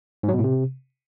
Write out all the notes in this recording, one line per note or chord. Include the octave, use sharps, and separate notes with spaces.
G#2
F#3
B2
A2
C3